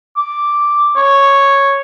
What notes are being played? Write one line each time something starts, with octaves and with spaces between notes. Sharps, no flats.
D6
C#5